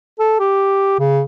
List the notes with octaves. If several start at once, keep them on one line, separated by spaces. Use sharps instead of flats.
A4
G4
C#3